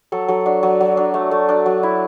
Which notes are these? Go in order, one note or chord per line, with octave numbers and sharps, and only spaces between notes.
F#3 A4
F#3 A4
D4 F#4
F#3
F#3
D4
A3
A3
D4
F#3
E4